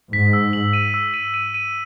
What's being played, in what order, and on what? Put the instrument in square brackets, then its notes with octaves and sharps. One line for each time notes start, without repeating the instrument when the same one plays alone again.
[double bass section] G#2 [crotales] B6
[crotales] E6
F#7
D#7
E6
D#7
D#7
D#7